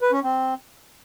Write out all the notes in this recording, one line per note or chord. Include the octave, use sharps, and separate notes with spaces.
B4
C#4
C4